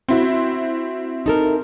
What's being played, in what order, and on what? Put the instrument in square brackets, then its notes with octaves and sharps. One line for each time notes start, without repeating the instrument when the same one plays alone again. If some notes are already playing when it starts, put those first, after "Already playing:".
[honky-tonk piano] C4 E4 F#4
[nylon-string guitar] D#4 A4 A#4